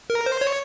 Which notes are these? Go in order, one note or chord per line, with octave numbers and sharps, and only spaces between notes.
A#4
C5
C#5